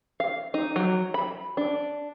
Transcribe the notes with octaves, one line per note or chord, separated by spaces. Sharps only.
F5
D#4
F#3
B5
D4